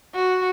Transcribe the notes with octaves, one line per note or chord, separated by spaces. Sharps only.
F#4